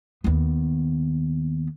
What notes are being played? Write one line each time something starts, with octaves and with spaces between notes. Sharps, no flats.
D#2 B3